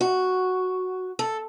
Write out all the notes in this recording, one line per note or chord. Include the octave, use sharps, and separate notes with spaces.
F#4
A4